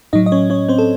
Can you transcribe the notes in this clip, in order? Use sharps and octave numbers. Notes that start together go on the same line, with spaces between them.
A2 F#3 D#4 D#5
D#5
C#4 C#5
C#4 C#5
C4 C5
A4